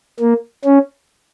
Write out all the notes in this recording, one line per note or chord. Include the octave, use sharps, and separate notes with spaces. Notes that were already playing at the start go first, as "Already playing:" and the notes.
A#3
C#4